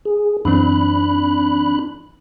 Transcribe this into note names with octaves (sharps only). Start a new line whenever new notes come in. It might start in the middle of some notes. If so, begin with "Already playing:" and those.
G#4
F#2 E3 C4 D4 B5 F#6